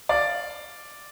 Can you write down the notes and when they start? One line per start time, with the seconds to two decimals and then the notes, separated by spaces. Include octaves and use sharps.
0.09 D5 F5